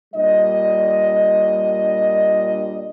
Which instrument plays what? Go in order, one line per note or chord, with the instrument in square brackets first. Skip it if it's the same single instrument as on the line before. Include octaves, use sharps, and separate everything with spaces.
[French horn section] A#2 G3 D4 D#5